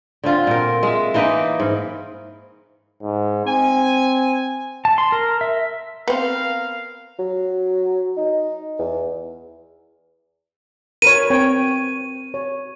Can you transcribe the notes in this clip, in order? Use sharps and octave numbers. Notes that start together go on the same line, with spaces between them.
D3 C4 F4
A#2 A#4
G#3 E5
E3 A#3 D#4 B4
G#2
G#2
C4 G#5
A5
C6
A#4
E5
B3 C4 A#4 F5
F#3
D#4
E2
A#4 B4 C#5 D#7
C4 C#5 G5
C#5